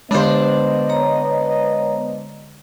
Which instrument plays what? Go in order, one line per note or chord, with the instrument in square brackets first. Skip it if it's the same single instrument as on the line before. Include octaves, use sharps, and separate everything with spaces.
[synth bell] D3 G#3 [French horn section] B3 D#5 [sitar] D4 C5
[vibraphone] C#5 A#5